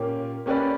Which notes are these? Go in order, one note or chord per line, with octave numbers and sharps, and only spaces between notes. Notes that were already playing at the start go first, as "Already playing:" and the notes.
Already playing: A#2 A#3 C#4 G4 C#5
A#3 C#4 G4 B4 D5